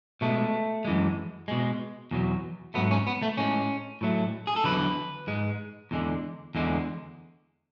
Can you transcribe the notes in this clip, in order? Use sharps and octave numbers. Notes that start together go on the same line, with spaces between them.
B2 G#3 A3
F#2 E3 G#3
B2 G#3
E2 B2 F#3
G#2 F#3 A3 B3
C#4
B3
A3
A2 G#3 C#4
A2 F#3 A3
G#4
A4
E2 D3 F#3 B4
G#2 G#3
E2 D3 G#3
E2 D3 G#3